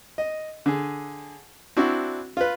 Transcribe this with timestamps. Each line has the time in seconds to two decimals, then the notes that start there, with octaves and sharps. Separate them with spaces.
0.18 D#5
0.66 D3 G#4
1.77 C4 D4 E4 F#4
2.37 F4 B4